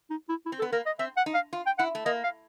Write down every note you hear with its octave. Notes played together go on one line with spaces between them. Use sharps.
D#4
E4
E4
C4
A4
B3
A#3 A#4
D#5
C4 E5
F#5
D#4
F5
F4
G5
E4 F#5
A3
A#3 D#5
F5